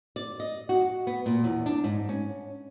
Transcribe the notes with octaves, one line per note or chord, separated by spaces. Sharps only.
D5
D#5
F#4
B3
A#2
E2
D4
G#2
C#4